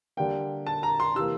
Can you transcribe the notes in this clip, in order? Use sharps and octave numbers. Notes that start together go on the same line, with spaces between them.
D3 G3 A#3 G5
A5
A#5
C6
C3 E3 A#3 E6